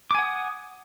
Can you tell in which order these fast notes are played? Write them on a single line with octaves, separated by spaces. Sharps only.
D6 G#5 F#5 D#6